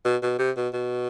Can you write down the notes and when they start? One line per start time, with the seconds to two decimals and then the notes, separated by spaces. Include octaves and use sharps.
0.05 B2
0.22 B2
0.39 C3
0.56 B2
0.73 B2